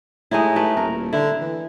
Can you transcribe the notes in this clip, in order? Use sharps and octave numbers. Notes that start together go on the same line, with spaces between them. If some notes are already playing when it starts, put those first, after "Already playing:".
A2 G#3 D#4 E4
A3 B4
D#1 A#4
D3 E4
E3